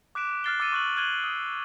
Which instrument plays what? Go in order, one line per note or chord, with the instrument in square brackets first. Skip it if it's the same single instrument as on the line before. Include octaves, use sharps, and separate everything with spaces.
[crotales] D6 F#6 B6 D7 E7
F6 F#6 A6 C7 G7
D6 E6 F#6 A6 C#7 D#7
C#6 D6 F#6 A6 F#7
F6 F#6 G#6 D#7 F#7 G7
D#6 F#6